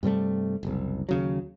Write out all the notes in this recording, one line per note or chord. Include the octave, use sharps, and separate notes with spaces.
G2 C3 G3 A3
F#1 C2
D#2 C#3 F#3